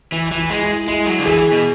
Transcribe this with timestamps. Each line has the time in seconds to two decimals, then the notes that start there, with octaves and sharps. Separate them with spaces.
0.12 E3 E4
0.31 E3
0.38 E4
0.50 G#3
0.63 E4
0.88 G#3 E4
1.06 F#3
1.19 D3
1.25 E3 G#4
1.52 B2